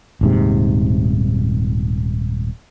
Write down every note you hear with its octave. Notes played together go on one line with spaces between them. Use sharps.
D#1 G#2 C3